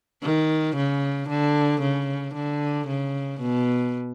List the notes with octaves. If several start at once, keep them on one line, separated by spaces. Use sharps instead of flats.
D#3
C#3
D3
C#3
D3
C#3
B2